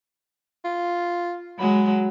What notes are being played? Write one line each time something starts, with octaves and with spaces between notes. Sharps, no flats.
F4
F#3 G#3 B5